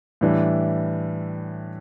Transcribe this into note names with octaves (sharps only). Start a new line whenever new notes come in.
A2 E3 G3 D4